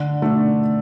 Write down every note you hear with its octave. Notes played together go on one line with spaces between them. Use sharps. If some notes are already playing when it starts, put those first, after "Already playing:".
Already playing: D3
A3 D4